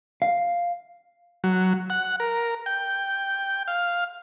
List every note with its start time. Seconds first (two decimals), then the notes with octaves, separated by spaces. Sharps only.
0.22 F5
1.44 F#3
1.90 F#5
2.20 A#4
2.66 G5
3.68 F5